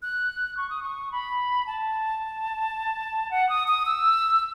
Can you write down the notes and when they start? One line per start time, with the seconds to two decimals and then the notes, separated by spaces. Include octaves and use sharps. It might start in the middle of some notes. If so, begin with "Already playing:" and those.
0.02 F#6
0.57 C#6
0.70 D#6
0.83 C#6
1.12 B5
1.67 A5
3.31 F#5
3.49 D#6
3.67 D#6
3.86 E6